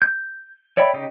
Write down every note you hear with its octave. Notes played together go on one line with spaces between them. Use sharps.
G6
C#5 D5 E5 G5 B5
C#3 D#4 G4 D#5